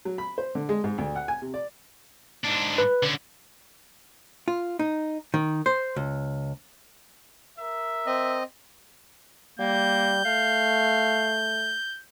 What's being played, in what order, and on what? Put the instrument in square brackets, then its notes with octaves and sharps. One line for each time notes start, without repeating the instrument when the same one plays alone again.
[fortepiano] F#3
B5
C5
D3
G#3
G#2
D2
F#5
G#5
C3
D5
[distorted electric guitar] G#2 D4
[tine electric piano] B4
[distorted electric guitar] D3 C#4
[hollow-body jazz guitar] F4
D#4
D#3
C5
C#2
[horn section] A#4 E5
[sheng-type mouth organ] C4 D#5
[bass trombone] G3 [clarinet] A#3 [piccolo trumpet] G6
[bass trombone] A3 [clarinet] F5